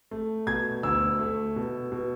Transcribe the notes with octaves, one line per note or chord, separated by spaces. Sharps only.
A3
B2 G#6
D2 E6
A3
B2
B2